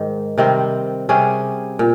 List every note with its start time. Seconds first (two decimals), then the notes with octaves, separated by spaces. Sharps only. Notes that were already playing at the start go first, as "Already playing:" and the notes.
Already playing: G#2 D#3
0.38 C3 D#3 G3 C4
1.09 C3 G3 C#4 G#4
1.79 A#2